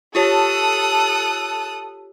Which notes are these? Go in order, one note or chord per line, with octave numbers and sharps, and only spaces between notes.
F4 G4 A4 C#5 D#6 F#6